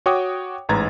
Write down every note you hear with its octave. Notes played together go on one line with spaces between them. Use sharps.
F#4 C#5 G5 D6 D#6
A1 G#2 B4 A#5 G#6 A6